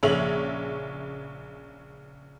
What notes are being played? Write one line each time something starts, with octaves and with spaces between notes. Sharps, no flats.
A#1 C#3 C#5 E5 F7 F#7